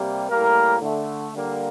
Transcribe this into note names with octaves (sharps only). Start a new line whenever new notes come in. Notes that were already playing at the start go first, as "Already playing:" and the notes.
Already playing: C3 G3 A#3
A2 G3 A#3 A#4
D3 A3
D3 G3 A#3